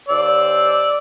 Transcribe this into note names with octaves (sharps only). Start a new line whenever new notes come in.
D#2 C5 D5 E6